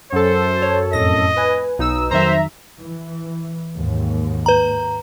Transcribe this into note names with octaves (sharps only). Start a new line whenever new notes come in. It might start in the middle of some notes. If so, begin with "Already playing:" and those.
F#2 A4 C5
C#5
F2 A2 D#5 A#6
B4 G#5
B1 D#4 E6
F2 D#3 F#3 C5 E5 A#5
E3
D#2 G#2
B4 A#5